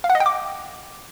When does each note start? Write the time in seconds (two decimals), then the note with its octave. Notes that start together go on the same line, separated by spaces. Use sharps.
0.04 F5
0.10 F#5
0.15 D#5
0.20 G5
0.26 D6